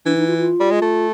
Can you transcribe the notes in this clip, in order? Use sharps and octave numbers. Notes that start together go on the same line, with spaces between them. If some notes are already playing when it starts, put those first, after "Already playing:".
E3 D4
D#4
F4
F4
G3
G#3
A3